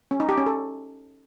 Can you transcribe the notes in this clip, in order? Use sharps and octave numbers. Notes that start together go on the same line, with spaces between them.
C#4
D#4
G4
C#4
A4